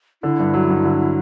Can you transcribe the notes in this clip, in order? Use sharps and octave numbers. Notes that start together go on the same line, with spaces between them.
D3 E4
G2
F#3
G2
D3